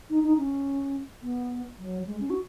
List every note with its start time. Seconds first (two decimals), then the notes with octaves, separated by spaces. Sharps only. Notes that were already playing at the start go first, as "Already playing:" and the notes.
0.10 D#4
0.24 D#4
0.38 C#4
1.23 B3
1.79 F#3
2.07 G#3
2.20 C#4
2.30 F#4